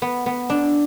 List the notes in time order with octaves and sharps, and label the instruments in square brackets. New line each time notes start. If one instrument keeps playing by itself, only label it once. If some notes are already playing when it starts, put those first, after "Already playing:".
[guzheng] B3
B3
D4